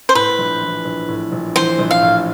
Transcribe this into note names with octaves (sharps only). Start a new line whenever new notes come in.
C5
A2 B4
A#1
E3
A#1
A2
A#1
E3 C5
A#1
F5
A2